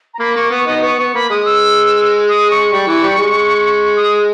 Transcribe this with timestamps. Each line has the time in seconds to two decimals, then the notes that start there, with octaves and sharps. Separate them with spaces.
0.14 A#5
0.19 A#3 B5
0.36 A#3 C#6
0.51 B3 C#6
0.67 B3 D#4 D#6
0.82 B3 C#6
0.99 B3 C#6
1.14 A#3 B5
1.30 G#3 D#6
1.45 E6
2.29 D#6
2.51 C#6
2.71 G3 C#6
2.87 E3
3.03 G3
3.18 G#3
3.96 D#6